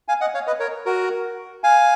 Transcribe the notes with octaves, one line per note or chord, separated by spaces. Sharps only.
F5 G#5
D#5 F#5
C#5 F5
B4 D#5
A#4 C#5
F#4 A#4
F5 G#5